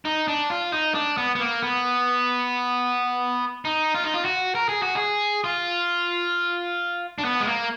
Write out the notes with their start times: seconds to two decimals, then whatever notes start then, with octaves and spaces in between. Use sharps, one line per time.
0.05 D#4
0.28 D4
0.50 F4
0.72 D#4
0.95 D4
1.17 B3
1.35 B3
1.40 A#3
1.62 B3
3.65 D#4
3.94 F4
4.04 D#4
4.14 F4
4.25 F#4
4.55 A#4
4.69 G#4
4.82 F#4
4.96 G#4
5.44 F4
7.18 D4
7.25 B3
7.40 G#3
7.47 A#3